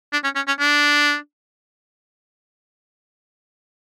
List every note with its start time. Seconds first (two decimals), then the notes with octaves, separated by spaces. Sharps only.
0.13 D4
0.24 C#4
0.36 C#4
0.47 C#4
0.59 D4